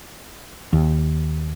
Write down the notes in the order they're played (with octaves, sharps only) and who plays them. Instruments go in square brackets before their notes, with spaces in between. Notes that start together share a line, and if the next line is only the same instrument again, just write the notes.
[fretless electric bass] D#2